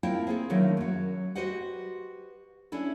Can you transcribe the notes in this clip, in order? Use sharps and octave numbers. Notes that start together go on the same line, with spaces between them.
A#3 C4 E4 F4 G5 A5
C4 G#4 A4
D3 D#3 F#3 A3 A#3 E4
F#2 F#3
F#4 G4 B4 C5 D#5 F#5
C#4 D4 E4 A4